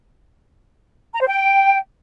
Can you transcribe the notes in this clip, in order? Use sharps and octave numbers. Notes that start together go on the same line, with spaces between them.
A#5
C5
G5